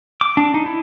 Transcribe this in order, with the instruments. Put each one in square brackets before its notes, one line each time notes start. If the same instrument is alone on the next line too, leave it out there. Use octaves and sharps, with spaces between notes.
[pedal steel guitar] D6
D4
D#4
E4